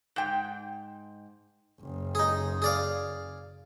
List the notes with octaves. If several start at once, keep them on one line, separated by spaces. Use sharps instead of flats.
G#2 G5
F#1
D#4 G#4
G#4 D5 F5